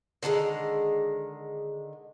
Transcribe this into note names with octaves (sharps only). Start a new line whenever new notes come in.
D3 D#3 F#3 G#3